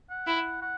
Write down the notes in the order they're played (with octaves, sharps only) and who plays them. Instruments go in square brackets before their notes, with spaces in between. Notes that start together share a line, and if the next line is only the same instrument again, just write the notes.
[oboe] F#5
[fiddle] E4
[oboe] F#5